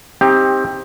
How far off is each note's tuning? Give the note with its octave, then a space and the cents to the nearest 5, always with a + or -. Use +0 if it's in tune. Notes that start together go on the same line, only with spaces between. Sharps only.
C4 +15 D#4 +25 G4 +15